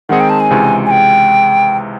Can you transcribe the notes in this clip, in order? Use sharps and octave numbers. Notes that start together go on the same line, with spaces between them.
D#3 G#3 C4 D#4 G#4 F#5
G5
A5
G#5
C#2 C3 E3 G#3
G#5
G5